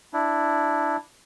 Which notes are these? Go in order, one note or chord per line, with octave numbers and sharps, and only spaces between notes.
D4 E4